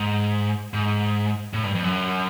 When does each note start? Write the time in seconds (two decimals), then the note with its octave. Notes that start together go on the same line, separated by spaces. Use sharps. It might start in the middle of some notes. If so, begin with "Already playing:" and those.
Already playing: G#2
0.74 G#2
1.54 A2
1.64 G2
1.75 F2
1.84 F#2